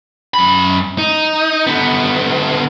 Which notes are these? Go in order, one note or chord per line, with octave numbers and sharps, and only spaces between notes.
F#2 B5
D#4
D3 B3